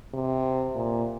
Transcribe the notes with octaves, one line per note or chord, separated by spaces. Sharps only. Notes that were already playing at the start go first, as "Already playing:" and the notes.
C3
A#2